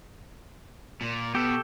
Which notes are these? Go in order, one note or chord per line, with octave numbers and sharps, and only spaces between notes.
A#2
B2 G4 A4